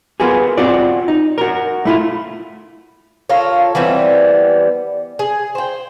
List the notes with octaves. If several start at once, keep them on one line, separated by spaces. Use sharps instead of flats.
A#3 B3 F4 F#4 G#4
C4 F4 F#4 D5
D#4
F#4 A#4
A3 E4 F4
F4 A4 A#4 C#5
E3 G3 B3 C4
G#4
C5 G5